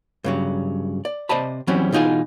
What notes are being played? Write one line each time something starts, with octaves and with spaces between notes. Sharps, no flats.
G2 C#3 F#3
D5
C3 C5 D5 D#5 A5 B5
E2 E3 F#3 G3 C4 C#4
B2 E3 D#4 F4 G#4